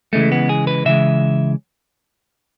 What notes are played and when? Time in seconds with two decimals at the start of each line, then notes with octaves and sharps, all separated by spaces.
0.13 C#3 E3 G#3 A3
0.32 B3
0.49 G#4
0.67 B4
0.85 C#3 E3 G#3 E5